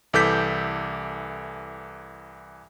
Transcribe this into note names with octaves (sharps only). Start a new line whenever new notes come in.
C2 E3 A4 D6 G6 B6